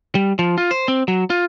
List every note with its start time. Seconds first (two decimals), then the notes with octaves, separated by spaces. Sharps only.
0.15 G3
0.39 F3
0.58 F4
0.71 C5
0.88 C4
1.08 F#3
1.30 F4